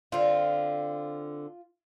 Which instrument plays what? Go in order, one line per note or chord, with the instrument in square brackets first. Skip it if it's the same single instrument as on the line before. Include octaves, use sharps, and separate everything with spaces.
[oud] D3 C4 [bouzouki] F4